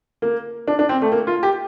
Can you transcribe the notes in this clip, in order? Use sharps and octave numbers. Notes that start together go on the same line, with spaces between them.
A#3
D4
D4
C4
A3
A#3
F4
G4